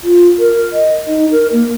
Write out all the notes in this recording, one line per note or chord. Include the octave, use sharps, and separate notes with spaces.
F4
A#4
D#5
D#4
A#4
A#3